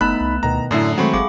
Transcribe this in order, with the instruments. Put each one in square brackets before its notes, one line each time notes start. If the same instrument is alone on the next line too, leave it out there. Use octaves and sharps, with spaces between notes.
[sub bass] F#1 [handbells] A3 B3 A5 [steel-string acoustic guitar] D#4 [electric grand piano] B5 F#6
[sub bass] C2
[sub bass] D2 [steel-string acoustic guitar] B2 D#3 [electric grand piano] A#5
[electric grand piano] F#2 D3 [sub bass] A2 [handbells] A3 D#6 C7 [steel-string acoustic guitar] E4 D5
[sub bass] D#3 [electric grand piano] F#3 C4 [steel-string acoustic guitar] G#3 A3 [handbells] F#5 B5 C#6
[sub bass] G1 [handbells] G#4 F5 D6